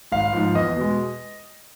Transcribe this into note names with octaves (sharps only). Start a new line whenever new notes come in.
G#1 F5
G#2 F3
E2 D#5
B2 G#3